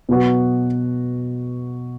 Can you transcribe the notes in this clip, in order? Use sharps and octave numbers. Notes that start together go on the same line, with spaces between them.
B2 F#3 B3 F#4